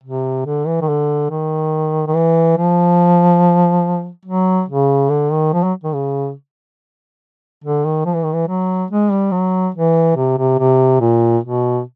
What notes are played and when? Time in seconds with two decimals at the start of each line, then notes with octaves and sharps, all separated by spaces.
0.04 C3
0.46 D3
0.67 E3
0.81 D#3
0.88 D3
1.30 D#3
2.07 D#3
2.15 E3
2.57 F3
4.25 F#3
4.68 C#3
5.10 D3
5.32 D#3
5.53 F3
5.63 F#3
5.84 D#3
5.95 C#3
7.64 D3
7.85 D#3
8.06 F3
8.15 E3
8.24 D#3
8.33 E3
8.48 F#3
8.91 G#3
9.11 G3
9.32 F#3
9.75 E3
10.16 C3
10.38 C3
10.59 C3
11.01 A#2
11.43 B2